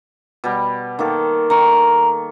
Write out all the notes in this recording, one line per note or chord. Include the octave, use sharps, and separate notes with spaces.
B2 G3
D#3 A#3 A4
D#3 A#5 C#6